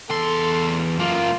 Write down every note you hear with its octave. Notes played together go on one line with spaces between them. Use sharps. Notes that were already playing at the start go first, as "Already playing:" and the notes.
E2 A4 C6
F#2 A#3 F4